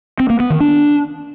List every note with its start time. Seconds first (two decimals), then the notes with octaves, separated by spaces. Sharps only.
0.20 C4
0.30 A#3
0.40 B3
0.50 D#3
0.60 D4